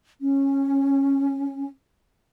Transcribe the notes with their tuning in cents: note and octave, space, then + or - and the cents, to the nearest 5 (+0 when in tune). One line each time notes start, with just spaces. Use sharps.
C#4 -15